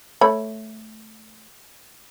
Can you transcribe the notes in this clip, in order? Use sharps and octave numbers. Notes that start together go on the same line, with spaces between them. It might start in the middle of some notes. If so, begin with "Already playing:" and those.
A3 C#5 B5